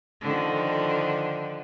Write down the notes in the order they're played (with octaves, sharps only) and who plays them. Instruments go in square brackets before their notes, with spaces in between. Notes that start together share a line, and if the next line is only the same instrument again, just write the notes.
[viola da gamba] D3 D#3 F3